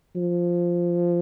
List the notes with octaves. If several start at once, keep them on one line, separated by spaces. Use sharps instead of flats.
F3